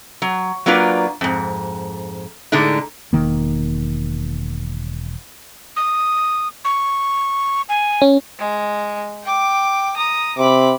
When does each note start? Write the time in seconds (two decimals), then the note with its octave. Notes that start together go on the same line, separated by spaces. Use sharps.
0.22 F#3
0.66 F#3 A#3 D4 F4 B4
1.21 F2 G#2
2.52 A2 D3 G#3 D#4
3.13 E1 D#3 A#3
5.76 D#6
6.65 C#6
7.69 G#5
8.02 C#4
8.39 G#3
9.23 G5 D6
9.97 A#5 D#6
10.38 C3 B5 D6